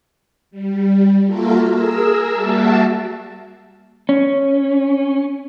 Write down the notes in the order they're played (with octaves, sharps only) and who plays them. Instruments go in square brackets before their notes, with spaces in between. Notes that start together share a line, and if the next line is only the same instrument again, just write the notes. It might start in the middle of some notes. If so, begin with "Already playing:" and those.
[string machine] G3
A#3 F4 F#4 A4 A#4 E5
G#4 A#4 E6
G3 A#3 F#4 E5 A5
[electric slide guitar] C#4